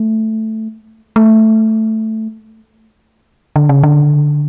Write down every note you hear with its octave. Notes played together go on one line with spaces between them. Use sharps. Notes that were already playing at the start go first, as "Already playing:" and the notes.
Already playing: A3
A3
D3
C#3
D3